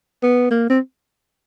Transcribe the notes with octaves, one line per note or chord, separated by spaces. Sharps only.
B3
A#3
C4